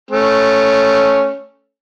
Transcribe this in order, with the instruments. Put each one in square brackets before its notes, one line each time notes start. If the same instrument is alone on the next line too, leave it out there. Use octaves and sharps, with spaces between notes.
[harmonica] A3 C#4